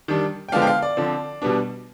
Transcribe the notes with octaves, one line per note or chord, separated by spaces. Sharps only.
D#3 G3 D4
G5
D3 F3 G#3 B3 D4 F5
G5
F5
D5
D3 F3 C4
B2 G3 B3 D4